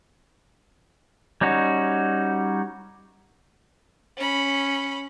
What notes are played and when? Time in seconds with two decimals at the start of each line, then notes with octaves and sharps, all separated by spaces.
1.41 G3 C#4 D#4 F#4
4.17 C#4 B5